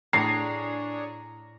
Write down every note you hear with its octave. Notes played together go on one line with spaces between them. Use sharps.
A2 D4 G#4 C#5 A#5 C7